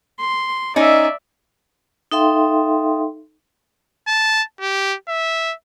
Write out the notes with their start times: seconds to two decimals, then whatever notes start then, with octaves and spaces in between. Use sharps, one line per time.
0.19 C6
0.76 C#4 D#4 D5 E5
2.11 D#4 A4 E5 F5 G5 C6
4.07 A5
4.61 G4
5.08 E5